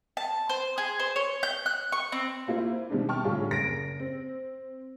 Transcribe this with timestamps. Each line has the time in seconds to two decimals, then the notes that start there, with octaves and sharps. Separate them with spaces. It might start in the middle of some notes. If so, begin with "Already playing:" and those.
0.17 A5
0.49 C5
0.78 G#4
0.99 C5
1.16 C#5
1.43 G6
1.66 F#6
1.92 C#6
2.12 C4
2.47 A#3 E4 F4 C5
2.90 B2 D#3 G3 G#3 C4 D4
3.09 G5 A5 C#6 F6
3.24 A2 D3 G3 D4 F4 G#4
3.49 F#1 A#6 D7
4.00 C4